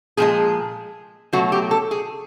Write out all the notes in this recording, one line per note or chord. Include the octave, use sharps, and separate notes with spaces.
A#2 F3 G#3 G#4
B2 F#3 A3 F#4
G4
A4
G#4